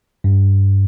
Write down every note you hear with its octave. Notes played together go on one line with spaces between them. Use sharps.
G2